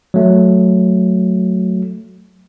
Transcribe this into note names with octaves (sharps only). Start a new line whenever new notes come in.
F#3 A3